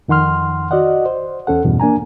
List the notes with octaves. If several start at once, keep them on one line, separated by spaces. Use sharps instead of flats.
F2 D#3 F#5 C6 F6
F#4 D5 D#5 F#5
C5
E2 C#4 A4 F#5
E2 G2 B2
A#3 D4 G#5 A#5